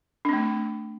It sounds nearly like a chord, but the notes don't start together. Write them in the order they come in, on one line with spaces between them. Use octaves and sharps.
D4 C4 A3